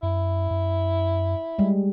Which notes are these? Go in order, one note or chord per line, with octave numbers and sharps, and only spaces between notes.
F#2 E4
F#2
G3 G#3